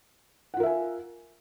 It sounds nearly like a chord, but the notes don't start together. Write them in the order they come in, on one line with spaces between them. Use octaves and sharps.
F#5 F4 A#4 E5 G#5